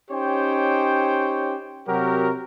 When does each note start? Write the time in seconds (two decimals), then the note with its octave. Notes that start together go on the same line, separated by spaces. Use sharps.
0.11 C#4 D#4 G4 C5 C#5 G5
1.87 C3 F#3 F#4 G4 A#4